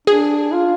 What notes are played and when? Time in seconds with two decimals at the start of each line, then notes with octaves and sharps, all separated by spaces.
0.07 D4 G#4
0.52 F4